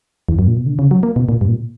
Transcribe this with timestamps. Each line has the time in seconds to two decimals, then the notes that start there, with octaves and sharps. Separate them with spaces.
0.29 E2
0.39 F#2
0.48 A#2
0.57 B2
0.66 D3
0.79 C#3
0.91 F#3
1.03 A#3
1.16 B2
1.29 A#2
1.41 G2
1.49 A#2